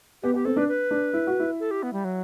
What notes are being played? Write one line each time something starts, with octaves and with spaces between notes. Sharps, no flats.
B3 G4
B3 G4
C4 A4
D4 B4
B4
D4
E4
F#4
E4
A4
G4
B3
G3
F#3